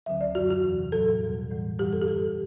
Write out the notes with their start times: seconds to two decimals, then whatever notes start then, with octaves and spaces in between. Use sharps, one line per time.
0.06 D2 D3 F#3 E5
0.21 D5
0.35 F#2 F#3 F#4
0.51 F#4
0.64 E2 C3 E3
0.92 A2 F#3 A4
1.21 E2 B2 G3
1.50 A2 E3 G3
1.79 F#2 E3 G3 G4
1.93 A4
2.01 G4
2.07 G2 D3 G3 A4